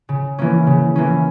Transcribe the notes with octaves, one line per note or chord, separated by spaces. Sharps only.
C#3
E3 A#3 C#4
C#3
E3 A#3 C#4